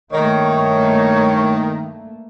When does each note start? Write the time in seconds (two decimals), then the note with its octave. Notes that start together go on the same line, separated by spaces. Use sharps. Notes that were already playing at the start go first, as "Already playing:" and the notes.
0.12 G2 D#3 A3 A#3 C#5